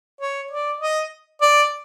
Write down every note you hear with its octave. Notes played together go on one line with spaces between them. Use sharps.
C#5
D5
D#5
D5